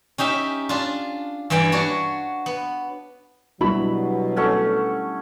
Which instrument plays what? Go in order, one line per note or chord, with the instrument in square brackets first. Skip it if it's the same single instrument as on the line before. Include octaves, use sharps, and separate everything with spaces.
[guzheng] C#4 D#4 G4 E5
D4 F4
G2 E3 D5 G5
D4 F#4 C#5
B3
[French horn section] B2 F#3 [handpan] G3 B3 D4 [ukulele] E4 F#4 B5
[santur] A3 C#4 F#5